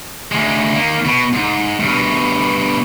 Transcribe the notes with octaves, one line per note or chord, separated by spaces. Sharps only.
D2 G#3
D#3 A#3
B2
G#2
G2 B2